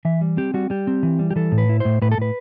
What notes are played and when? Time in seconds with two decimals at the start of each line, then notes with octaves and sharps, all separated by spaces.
0.05 E3 E5
0.21 G3
0.37 C4 G4
0.54 G3 F#4
0.70 G3 G4
0.87 C4
1.03 E3
1.19 G3
1.31 G4
1.36 E3 A4
1.52 A2
1.58 B4
1.69 E4
1.80 A2 C5
2.02 A2 B4
2.11 A4
2.18 A2 B4